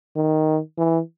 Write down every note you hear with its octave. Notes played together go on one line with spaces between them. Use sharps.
D#3
E3